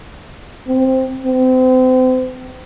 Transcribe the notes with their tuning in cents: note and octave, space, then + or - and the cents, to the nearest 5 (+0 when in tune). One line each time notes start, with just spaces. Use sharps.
C4 +0
C4 -35